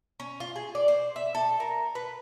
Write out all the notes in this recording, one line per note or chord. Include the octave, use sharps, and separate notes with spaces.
C#4
F4
G#4
D5
C5
E5
A4
A#4
B4